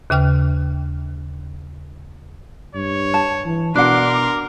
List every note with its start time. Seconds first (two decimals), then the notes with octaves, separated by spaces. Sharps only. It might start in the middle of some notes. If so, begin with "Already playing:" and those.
0.10 D#2 C#3 G5 F6
2.75 G2 C#5
3.14 A5
3.45 E3
3.75 B2 D4 A#4 F#5 C6 D6